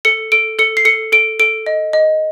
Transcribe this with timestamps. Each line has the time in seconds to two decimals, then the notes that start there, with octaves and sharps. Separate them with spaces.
0.05 A4 C#7
0.32 A4 D7
0.59 A4 C#7
0.77 C7
0.85 A4 C#7
1.12 A4 D7
1.40 A4 D7
1.66 D#5
1.93 D#5